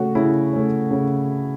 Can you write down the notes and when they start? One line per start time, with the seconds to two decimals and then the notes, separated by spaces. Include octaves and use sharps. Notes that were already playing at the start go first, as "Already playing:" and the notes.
Already playing: C#3 A3 C#4 F#4
0.15 C#3 E4
0.53 A3 C#4
0.91 C#3